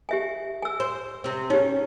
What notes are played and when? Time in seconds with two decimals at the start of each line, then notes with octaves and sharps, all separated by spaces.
0.09 G4 E5 G#5
0.62 G#5 E6
0.80 C5
1.24 C3 C4
1.50 C#4 D#4 G4